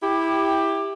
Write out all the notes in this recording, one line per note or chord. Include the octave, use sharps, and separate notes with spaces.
E4 G4